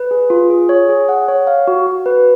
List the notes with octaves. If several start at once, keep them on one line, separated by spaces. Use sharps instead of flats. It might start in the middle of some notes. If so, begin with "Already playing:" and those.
Already playing: B4
G#4
F4
G#4
C#5
G#4
F#5
C#5
F5
F#4
F#4
B4